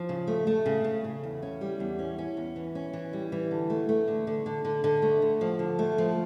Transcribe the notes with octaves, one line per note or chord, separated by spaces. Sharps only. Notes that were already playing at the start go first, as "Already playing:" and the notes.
Already playing: F3
C#3
A3
A3
C#3
C#3
C#3
E2
C#4
G3
E2
C#4
C#4
E2
E3
C#4
E3
G3
E3
D3
A3
A3
D3
D3
D3
D3
D3
A3
D3
F3
D3
A3
F3